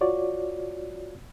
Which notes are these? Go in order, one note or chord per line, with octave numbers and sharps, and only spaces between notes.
F4 F#4 C#5 D5